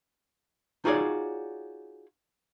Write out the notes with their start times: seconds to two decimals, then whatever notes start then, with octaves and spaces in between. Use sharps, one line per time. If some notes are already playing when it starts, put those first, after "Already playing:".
0.85 D#4 F4 F#4 G#4 C#5 D5